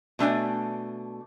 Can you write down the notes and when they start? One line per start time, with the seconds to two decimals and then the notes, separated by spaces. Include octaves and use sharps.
0.19 B2 A3 D4 G#5